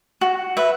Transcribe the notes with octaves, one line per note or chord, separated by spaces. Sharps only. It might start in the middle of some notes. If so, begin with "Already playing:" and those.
F#4
B4 E5